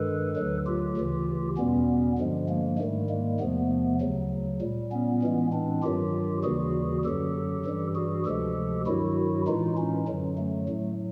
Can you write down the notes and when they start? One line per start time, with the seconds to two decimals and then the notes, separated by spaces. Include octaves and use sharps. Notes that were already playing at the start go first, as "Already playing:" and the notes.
Already playing: G2 D#3 G#3 A4 B4
0.36 D2 D3 F#3
0.66 F4 G4
0.97 D2 C#3 E3
1.57 E2 B2 G3 B3 C#4
2.18 G2 D3 F3 G#3
2.49 G#3 A#3
2.79 G#2 D#3 G3 A3
3.09 G#3 A#3
3.40 E2 C3 F3 A3 B3
4.01 D2 C#3 F#3
4.61 A#2 G3
4.92 B3 C#4
5.22 A2 E3 G#3
5.53 C4 D4
5.83 G2 D#3 F#3 F4 G4
6.43 D#2 C#3 E3 G3 F#4 G#4
7.05 F#2 D3 F#3 G4 A4
7.65 G2 E3 G3
7.95 F#4 G#4
8.26 D2 C3 F3 G#3 G4 A4
8.86 G2 D#3 F#3 E4 F#4
9.47 A2 E3 G#3 D#4 F4
9.77 C#4 D#4
10.08 F#2 D3 F#3
10.38 A3
10.69 A2 F#3